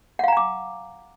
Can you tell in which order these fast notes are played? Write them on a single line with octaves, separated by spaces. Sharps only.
F#5 F5 A#5 G#5 D6